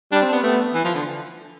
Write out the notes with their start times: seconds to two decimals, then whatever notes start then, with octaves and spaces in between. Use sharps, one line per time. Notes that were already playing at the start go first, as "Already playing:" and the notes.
0.12 G3 D4
0.22 C4
0.33 B3
0.43 A3 B3
0.75 E3
0.85 F3
0.95 D3